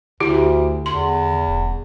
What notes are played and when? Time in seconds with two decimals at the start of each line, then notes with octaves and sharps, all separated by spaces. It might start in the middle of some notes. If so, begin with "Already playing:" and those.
0.20 D2 D3 E4 G4
0.86 E2 C6
1.48 D#1